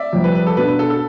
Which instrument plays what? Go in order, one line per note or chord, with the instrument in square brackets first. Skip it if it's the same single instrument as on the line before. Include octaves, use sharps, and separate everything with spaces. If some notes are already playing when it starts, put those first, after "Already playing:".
Already playing: [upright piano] D5 E5
[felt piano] F2 C3 G3
[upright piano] B4
B4
A4
[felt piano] B2 B3 D4 [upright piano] B4
[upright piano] B4
A4
A4